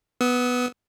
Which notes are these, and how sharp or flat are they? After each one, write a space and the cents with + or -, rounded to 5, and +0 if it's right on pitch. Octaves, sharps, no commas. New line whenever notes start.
B3 +0 E6 -45